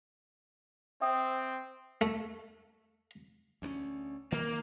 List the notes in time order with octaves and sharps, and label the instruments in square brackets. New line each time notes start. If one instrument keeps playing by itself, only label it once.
[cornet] C4 [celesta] E5 G5 D#6
[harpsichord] A3
[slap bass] D2 A#3 C#4
[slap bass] D#3 [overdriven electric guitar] A#3